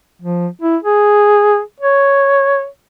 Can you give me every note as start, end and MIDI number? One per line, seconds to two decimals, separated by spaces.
0.22 0.48 53
0.62 0.77 64
0.83 1.60 68
1.81 2.67 73